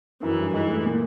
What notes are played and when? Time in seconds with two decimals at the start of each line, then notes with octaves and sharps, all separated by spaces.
0.22 F#2 E3
0.38 G2
0.54 G#2 E3
0.70 A2
0.85 A#2